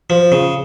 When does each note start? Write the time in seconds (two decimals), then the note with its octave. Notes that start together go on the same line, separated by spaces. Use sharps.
0.10 F3
0.32 C#3